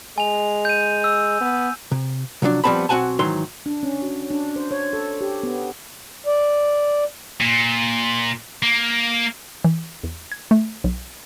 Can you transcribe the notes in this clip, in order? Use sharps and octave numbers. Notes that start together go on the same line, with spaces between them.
G#3 G#5 F7
G6 D#7
E6
B3
C3
C3 F3 F#3 D4
F3 G3 B3 C4 A5 B5
B1 C4 F#4 F#5 G#5 A5
G#2 D#3 E3 F#3 C6
D4
C#4
F#4
D4
C5
C#5
A4
G4
B3
D5
A#2
A#3
E3
E2
G#6
A3
B1